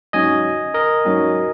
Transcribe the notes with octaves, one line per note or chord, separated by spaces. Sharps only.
G#2 F#3 C#4 D#5 G#5
A#4 D#5
G#2 F#3 C#4